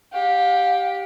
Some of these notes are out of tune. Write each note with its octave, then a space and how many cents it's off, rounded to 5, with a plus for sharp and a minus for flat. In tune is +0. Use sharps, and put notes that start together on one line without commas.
G4 +0 F5 +35